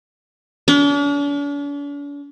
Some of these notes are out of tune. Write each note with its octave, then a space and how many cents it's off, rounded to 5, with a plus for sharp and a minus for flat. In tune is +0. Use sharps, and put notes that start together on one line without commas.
D4 -45